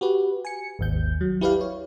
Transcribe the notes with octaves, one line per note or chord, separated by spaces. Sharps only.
F#4 G4 B4
G#5 C#7
G#1 D#2 G6
F#3
E4 G4 B4 D5 F5
C#5